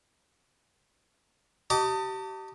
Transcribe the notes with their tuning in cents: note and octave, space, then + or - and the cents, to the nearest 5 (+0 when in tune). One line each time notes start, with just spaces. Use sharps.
G4 -30 D#5 +0 A5 +35